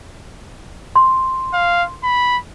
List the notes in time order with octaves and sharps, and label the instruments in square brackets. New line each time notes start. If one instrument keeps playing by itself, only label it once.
[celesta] C6
[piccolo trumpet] F5
B5